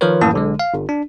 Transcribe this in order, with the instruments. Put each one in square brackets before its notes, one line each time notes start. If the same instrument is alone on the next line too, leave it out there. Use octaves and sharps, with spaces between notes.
[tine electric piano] D#3 F3 F4 A#4 B4 C#5
F#2 A2 E3 A#3 A5 D#6
B1 D3 G#3
F5
G1
D4